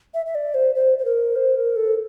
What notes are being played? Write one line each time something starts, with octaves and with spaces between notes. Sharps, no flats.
E5
E5
D5
C5
C5
C5
A#4
C5
A#4
A4